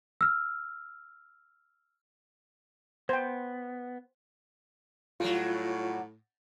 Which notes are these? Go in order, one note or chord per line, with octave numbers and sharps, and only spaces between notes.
E6 F6
B3 C5 G5
A2 F#3 G3 F4